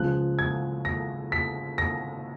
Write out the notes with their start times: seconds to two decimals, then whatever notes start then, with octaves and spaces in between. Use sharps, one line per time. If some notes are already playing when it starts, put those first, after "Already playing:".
Already playing: C#2 C#3 F3 F#6
0.39 G#6
0.85 A#6
1.32 B6
1.78 A#6